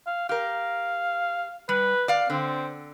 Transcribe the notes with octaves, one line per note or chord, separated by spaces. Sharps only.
F5
G4 A#4 F5
G3 B4
D5 F5
D3 C4